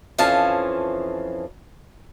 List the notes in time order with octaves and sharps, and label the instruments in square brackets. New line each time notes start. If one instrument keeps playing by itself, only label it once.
[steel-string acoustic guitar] F2 E3 F3 C#4 F5 A5